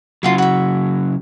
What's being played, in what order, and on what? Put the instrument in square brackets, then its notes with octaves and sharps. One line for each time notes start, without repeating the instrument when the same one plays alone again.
[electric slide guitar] C#3 F#3 [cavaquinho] F4 F#4 F5
[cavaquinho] F#4 E5